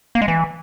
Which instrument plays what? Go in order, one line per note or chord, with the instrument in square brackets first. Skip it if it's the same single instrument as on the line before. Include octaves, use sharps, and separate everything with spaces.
[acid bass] A#3
G#3
E3